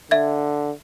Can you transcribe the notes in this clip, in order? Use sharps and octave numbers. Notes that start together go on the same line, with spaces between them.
D3 E5 G#6